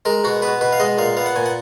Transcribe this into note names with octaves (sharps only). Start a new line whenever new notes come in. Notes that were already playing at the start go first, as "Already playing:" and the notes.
G#3 A#4
B2 F#4
B3 B4
B2 B4
F5
G#3 D#5
A#2 F5
B3 F5
F#5
A#2 G#5
F#5